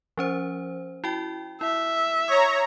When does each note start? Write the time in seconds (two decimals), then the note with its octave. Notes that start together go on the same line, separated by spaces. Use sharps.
0.17 F3 C#4 C5
1.04 E4 F#4 G5
1.61 E4 E5
2.28 C#5 A#5 D#6